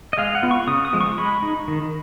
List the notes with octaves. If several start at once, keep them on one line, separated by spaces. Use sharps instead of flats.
D#5
G#3 F5
F#5
B3 F4
C#6
C#3 D#6
D#6
F3 G#3
C#6
G#3 B5
D#4
D#3